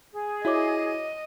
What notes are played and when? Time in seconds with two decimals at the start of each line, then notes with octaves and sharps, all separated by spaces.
0.12 G#4
0.45 E4 F#4 C#5 D#5 D6